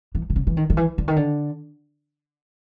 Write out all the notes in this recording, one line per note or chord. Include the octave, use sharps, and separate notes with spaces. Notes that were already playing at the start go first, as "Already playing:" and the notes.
E3
C3
C#3
E3
D#3
D#3
E3
D3
D#3
D3